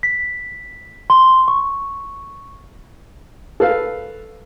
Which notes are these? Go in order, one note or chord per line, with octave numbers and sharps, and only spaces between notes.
B6
C6
C#6
A4 B4 F5